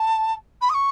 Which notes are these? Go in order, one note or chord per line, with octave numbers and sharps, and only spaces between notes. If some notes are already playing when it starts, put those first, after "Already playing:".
Already playing: A5
B5
D#6
C#6